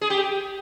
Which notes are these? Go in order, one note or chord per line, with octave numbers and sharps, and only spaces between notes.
G#4
G4